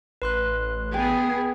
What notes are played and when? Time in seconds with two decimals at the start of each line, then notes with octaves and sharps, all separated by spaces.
0.22 A1 B4 C6 F#6
0.94 B3 G#4 G5